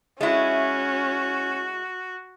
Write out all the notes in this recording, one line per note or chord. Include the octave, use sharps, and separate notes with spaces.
G#3 C#4 E4 F#4